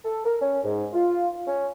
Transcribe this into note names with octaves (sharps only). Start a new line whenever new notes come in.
A4
A#4
C#4
G#2
F4
C#4